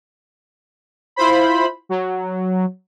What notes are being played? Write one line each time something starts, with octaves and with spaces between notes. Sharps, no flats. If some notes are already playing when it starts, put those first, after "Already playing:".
E4 F4 C5 B5
F#3